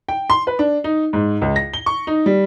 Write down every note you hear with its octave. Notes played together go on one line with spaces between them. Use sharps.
G5
C6
B4
D4
D#4
G#2
C#2
A#6
G7
C#6
D#4
G3